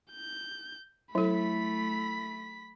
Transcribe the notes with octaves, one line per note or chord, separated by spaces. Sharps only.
G6
F#3 A3 E4 A4 B5 B6